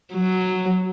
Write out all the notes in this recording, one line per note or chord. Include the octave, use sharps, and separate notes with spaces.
F#3